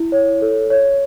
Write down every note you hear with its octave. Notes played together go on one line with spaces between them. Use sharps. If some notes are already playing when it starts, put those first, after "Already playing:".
Already playing: E4
C#5
A4
C#5